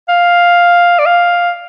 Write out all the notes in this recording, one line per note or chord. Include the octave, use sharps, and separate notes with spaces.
F5
D5
F5